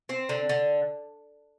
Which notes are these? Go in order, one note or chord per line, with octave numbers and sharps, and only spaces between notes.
C4
D3
D3